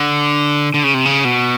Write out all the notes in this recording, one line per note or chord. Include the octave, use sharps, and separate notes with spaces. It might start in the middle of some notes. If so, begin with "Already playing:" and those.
Already playing: D3
D3
C#3
C3
C#3
B2